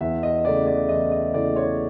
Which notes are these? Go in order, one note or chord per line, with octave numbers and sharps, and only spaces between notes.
E2 E5
D#5
C#3 E3 A3 D5
D5
E2 D#5
D#5
C#3 E3 A3 D5
C#5